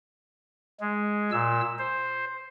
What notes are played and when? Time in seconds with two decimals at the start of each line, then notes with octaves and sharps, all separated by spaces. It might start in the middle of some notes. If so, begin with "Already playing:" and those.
0.80 G#3
1.31 A#2 E6
1.79 C5